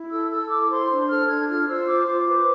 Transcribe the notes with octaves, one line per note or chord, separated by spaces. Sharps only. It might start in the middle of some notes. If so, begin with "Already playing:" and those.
Already playing: E4
A4 E6
A4 E6
E4 D6
C5 C6
D4
A4 F6
D4 G#6
F4 F6
C5 E6
F4 D6
C5 D6
B4